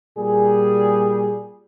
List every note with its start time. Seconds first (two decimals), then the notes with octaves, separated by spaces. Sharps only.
0.17 A#2 G3 G#4